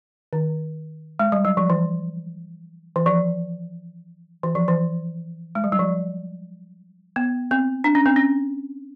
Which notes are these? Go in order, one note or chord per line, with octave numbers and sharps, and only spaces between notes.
D#3
G#3
G3
F#3
F3
E3
E3
F3
E3
F3
E3
G#3
G3
F#3
F3
B3
C4
D4
C#4
C4
C#4